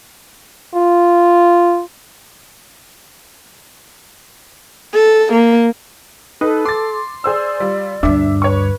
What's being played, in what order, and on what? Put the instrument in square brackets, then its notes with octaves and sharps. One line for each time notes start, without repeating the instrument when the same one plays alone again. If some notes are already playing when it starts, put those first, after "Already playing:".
[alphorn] F4
[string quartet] A4
A#3
[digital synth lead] D#4 [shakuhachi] A4 [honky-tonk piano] B4
[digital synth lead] C6 [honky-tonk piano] D6 A6
[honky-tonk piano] G#4 C5 E6 [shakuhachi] D5
[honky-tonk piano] G3 F4
[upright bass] D2 G2 [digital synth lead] D4 [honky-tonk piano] E5
[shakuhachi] B4 [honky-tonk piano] C#5 C#6